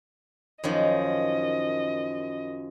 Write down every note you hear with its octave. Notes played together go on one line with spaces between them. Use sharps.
F#2 D#3 F3 D#5